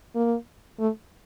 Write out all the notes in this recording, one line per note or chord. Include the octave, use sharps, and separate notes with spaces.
A#3
A3